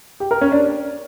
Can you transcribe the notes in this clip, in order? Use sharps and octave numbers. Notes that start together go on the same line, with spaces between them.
G4
A#4
C#4
D4